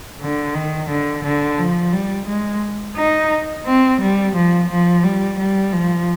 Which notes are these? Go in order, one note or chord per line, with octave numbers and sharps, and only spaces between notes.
D3
D#3
D3
D3
F3
G3
G#3
D#4
C4
G3
F3
F3
G3
G3
F3